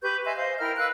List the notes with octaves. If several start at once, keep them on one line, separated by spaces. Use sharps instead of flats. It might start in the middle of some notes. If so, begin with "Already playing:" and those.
G4 B4 C#6 G6
D#5 E5 G#5 C6
C5 D#5 F5
E4 A#4 G5 F6
B4 F5 E6 F#6